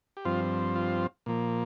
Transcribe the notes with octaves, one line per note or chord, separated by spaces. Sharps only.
G4
G2 F3 C4 F4
F4
A#2 F3 A#3